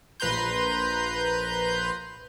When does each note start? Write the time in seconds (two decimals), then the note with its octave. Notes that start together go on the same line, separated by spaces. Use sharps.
0.20 A#1 B4 A#5 C6 G6